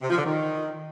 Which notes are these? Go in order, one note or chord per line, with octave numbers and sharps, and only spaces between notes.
C3
F3
D3
D#3